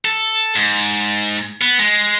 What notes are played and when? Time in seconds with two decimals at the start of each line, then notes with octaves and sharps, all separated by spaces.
0.05 A4
0.56 G#2
1.61 B3
1.79 G#3